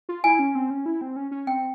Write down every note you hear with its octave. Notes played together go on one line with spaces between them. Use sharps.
F4
E4 G#5
C#4
C4
C#4
E4
C4
C#4
C#4
C4 G5